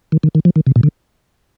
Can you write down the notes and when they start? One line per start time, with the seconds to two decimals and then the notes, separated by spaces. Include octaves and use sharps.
0.12 D#3
0.23 D#3
0.35 D#3
0.45 F3
0.56 D#3
0.67 C3
0.76 A#2
0.83 D3